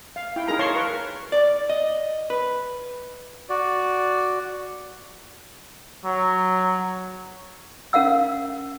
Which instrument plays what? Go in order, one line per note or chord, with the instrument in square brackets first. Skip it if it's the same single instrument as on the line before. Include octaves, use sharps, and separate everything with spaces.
[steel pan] F5
E4 G5
D#4 G#4 A#4 A#5
C#5 F5 A5 C6 C#6
A#4 B4 C#6
[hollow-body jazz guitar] D5
D#5
B4
[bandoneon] F#4 D5
[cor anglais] F#3
[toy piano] C#4 A#4 F5 F#5 E6